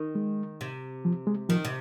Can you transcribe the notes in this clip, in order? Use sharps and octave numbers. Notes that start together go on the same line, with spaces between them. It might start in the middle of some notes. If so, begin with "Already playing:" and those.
Already playing: D#3
G#3
C3
F3
G#3
D#3 F3
C3